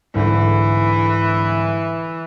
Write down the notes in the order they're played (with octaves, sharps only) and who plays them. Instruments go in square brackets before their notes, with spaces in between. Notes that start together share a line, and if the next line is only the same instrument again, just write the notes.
[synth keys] C2 G#2 D3 [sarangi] E3